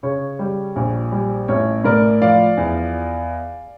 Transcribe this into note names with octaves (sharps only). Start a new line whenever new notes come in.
C#3 C#5
G3
A#1
G3
A1 C#5
A2 A#4 D5
F3 D5 F5
E2